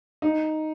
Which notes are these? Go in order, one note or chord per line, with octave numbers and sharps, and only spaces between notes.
D#4